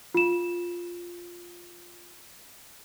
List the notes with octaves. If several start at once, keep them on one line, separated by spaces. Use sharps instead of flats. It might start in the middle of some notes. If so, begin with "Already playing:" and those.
F4 E7